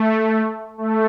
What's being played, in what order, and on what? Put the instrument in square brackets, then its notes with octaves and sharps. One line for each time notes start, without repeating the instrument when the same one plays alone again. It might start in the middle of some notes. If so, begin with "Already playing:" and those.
Already playing: [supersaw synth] A3
A3